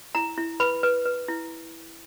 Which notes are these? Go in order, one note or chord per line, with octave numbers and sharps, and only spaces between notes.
E4 A#5
E4
B4 B5
B4
B4
E4